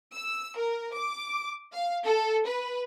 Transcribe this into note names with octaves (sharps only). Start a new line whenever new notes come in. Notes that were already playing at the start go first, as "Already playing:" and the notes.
E6
A#4
D6
F5
A4
B4